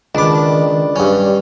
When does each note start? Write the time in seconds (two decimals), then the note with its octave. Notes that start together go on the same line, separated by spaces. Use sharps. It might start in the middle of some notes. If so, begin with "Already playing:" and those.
0.15 C#2 D#3 D4 D#5 B5 D6
0.96 G2 G3 C#4